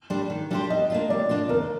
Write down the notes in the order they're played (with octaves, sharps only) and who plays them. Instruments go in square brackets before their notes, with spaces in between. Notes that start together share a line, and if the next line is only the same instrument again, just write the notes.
[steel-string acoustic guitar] G3 D4 G4 C5
D#3
G3 D4 G4 C5
[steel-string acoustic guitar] G3 [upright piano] D#5
[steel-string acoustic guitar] A#3 D4 F4
[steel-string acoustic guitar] G3 [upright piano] D5
[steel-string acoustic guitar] A#3 D4 F4
[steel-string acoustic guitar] D#2 [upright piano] A#4